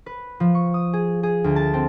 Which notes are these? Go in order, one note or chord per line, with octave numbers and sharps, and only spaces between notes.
B4
F3
C#6
D#6
G#4
G#4
D2
A5
C4